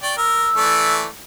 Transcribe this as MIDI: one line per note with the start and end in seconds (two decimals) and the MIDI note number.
0.03 0.14 74
0.03 0.14 79
0.03 0.17 85
0.17 0.49 70
0.17 0.93 88
0.56 1.07 52
0.56 1.07 57
0.56 1.07 74